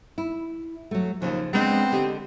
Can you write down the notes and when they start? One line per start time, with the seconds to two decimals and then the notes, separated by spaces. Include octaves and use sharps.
0.18 E4
0.91 F#3 A3
1.22 D#2 C#3 F3
1.53 G#3 B3 C4 D4 D#5
1.92 D3 G4 D#5